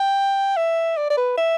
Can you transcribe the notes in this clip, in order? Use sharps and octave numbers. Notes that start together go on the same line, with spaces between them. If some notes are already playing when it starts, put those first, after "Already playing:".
Already playing: G5
E5
D5
D5
B4
E5